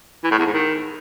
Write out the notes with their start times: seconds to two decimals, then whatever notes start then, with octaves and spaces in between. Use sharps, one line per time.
0.24 E3
0.31 A2
0.38 E2
0.46 G#2
0.53 D#3